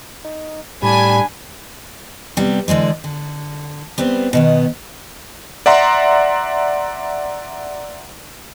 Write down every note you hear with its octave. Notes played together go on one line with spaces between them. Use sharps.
D#4
A2 G3 D4 G#5 B5
C3 G3 B3
D3 E3 G#3 D5
D3
G3 B3 C4
B2 D#3 B3
D5 E5 F#5 A#5 C6